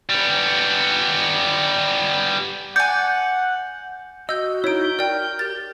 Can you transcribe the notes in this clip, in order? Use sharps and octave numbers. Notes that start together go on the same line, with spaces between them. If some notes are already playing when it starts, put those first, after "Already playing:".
G3 B3
D5 F#5 G#5 G6
F#4 D#5 E6 G6
D#4 E4 C#5 G6 D7
A#4 D5 G5
G4 A6